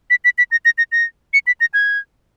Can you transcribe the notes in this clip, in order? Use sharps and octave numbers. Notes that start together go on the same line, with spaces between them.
B6
B6
B6
A#6
A#6
A#6
A#6
C#7
B6
A#6
G#6